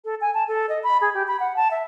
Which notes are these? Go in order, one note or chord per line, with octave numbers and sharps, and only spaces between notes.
A4
G#5
A5
A4
D#5
B5
G#4
G4
B5
F#5
A5
E5